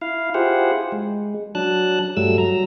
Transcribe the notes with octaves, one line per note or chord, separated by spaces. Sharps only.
E4 F5
E4 F4 G4 G#4 C5 F#5
G#3
F#3 D4 A5 F#6
G2 F#3 G3 A3 E6
F#3 A#5